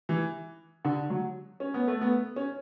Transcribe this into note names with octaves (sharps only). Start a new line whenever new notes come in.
E3
D3
F#3
C#4
B3
A3
B3
C#4